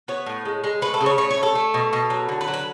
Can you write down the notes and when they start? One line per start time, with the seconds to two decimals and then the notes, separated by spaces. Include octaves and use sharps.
0.08 B3 C#5
0.26 A2
0.45 G#3
0.64 G#3
0.82 A3 B4
0.94 A4
1.01 C#3
1.06 C#5
1.18 A3 C#5
1.31 C#5
1.38 A3
1.43 A4
1.55 A3
1.74 B2
1.93 B2
2.10 F#3
2.29 D3
2.41 B4
2.48 F#3
2.54 B4